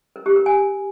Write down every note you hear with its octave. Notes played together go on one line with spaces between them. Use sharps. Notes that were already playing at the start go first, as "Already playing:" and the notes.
A#4
G4
A#4
G#5